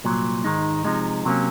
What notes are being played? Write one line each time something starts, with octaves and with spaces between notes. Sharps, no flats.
C2 A#2 F#3
G#2 D#3 G#3 D#4
C3 F3 G#3 D#4
C3 F#3 A#3 C#4